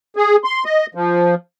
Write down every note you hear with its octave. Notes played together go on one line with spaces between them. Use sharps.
G#4
C6
D#5
F3